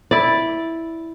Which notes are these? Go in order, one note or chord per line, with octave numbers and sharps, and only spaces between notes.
E4 D5